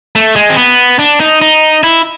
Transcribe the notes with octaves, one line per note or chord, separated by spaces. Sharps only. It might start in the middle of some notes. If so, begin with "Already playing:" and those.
A3
G#3
C4
B3
D4
D#4
D#4
E4